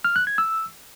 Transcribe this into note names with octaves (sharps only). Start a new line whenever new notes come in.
F6
F#6
G#6
E6